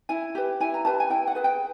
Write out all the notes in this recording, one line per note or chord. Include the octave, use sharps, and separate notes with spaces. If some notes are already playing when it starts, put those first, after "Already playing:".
E4 G#5
G4 B4
E4 G#5
A#5
G4 B4 A5
G#5
E4 G5
F#5
G#4 B4
G5